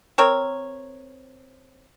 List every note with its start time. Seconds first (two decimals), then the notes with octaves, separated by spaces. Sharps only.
0.18 C4 A#4 C#5